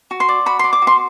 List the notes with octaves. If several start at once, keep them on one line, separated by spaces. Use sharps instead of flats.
F#4
C6
D5
F#4 B5
D5 C6
D6
F#4
C6